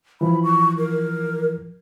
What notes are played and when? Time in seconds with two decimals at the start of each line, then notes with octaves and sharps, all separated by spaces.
0.21 E3 F3 B5
0.44 C#6
0.78 A#4